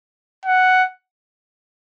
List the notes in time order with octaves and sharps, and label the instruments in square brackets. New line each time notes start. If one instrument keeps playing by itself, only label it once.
[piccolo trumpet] F#5